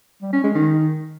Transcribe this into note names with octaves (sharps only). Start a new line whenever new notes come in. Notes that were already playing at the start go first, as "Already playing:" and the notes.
G3
C#4
G#3
D#3